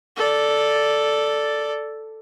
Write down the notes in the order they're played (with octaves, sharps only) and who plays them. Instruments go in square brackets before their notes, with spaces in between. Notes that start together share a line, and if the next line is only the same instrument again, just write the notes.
[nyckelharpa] A4 D5